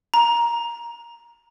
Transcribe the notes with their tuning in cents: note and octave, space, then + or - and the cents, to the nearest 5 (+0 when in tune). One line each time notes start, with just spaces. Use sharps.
A#5 +10